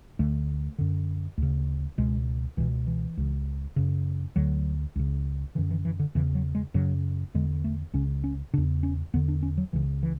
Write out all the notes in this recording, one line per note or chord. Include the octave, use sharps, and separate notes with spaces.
D2 D3 A3
F#2 D3
D2 C#3
C#2 B2 G#3
C#2 B2 E3
E3
C#2 C#3
F#2 C#3
D2 D3 F#3
C#2 C#3
F#2 D3 E3
E3
E3
D3
E2 C#3 E3
F#3
G#3
F#2 C#3 F#3
E2 D3 G#3
A3
C#2 C#3 C#4
C#4
E2 C#3 D4
C#4
E2 D3 B3
D4
C#4
F#3
C#2 C#3 E3
E3